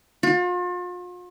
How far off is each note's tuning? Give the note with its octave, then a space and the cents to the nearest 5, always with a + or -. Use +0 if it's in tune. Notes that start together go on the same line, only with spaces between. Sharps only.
F4 +40